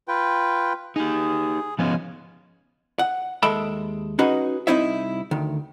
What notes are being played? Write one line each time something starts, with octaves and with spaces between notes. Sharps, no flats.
F4 B4 G5
D#4 G4 G#4
F3 G#3 B3 C#4 G#5
F#5
D#2 G#3 A4 E5 G5 B5
C#4 D#4 F#4 G#4 B4 C#5
C2 C4 D#4 E4 C#5 E5
D2 D#3